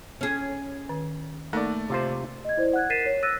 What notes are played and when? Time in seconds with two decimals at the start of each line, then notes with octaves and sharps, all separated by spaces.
0.21 C#4 G#4
0.89 D#3
1.53 A3 A#3 D#4 A#4 D5
1.90 C3 F4 C5
2.45 D#5 G#6
2.57 E4 C5 D5
2.73 F#5 F#6 G#6
2.90 A#4 A6 B6 C7 D#7 E7
3.06 C#5
3.23 E6 F#6 A6 A#6 D#7